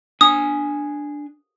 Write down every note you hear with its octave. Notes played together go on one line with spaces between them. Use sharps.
D4 G#5 D#6